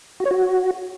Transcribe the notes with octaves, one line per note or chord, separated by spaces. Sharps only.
F#4
C#5
F#4